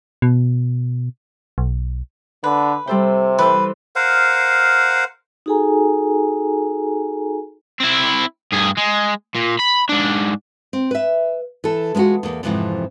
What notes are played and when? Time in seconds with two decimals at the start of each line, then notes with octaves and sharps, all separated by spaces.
0.22 B2
1.58 B1
2.44 D3 B4
2.87 C3 G3 A4 C5
3.39 E3 A4 B4 C5
3.96 A#4 C5 F5 F#5
5.46 D#4 F#4 G#4 A4 G#5 A#5
7.80 C4 E4
8.52 G2 G#4
8.77 G#3
9.35 A#2
9.59 B5
9.89 G#2 D4
10.73 C4
10.91 B4 E5
11.64 E3 A4
11.95 G#3 B3 D#4 F4 F#4
12.23 E2 A#3
12.43 F2 G#2 C3 E3 F3